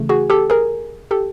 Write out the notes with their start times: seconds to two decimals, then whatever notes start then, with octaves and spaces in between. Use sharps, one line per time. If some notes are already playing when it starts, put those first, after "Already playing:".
Already playing: C#3 E3 A3
0.09 F#4 G#4
0.30 G4 A4
0.50 G#4 A#4
1.11 G4 A4